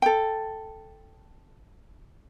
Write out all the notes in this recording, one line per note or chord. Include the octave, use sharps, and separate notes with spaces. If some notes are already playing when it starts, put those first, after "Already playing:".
A4 G5